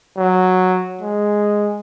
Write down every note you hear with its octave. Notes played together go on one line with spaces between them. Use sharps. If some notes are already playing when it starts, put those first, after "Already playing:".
F#3
G#3